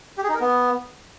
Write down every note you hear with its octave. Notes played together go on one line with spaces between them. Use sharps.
G4
G#4
D#4
A#4
B3